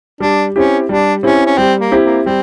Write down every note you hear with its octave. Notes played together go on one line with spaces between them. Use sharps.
G3 D4
C4 C#4 E4 G4
G3 D4
C4 C#4 E4 G4
C#4
G3 C4
A#3
C4 E4 G4
A#3
G3 C4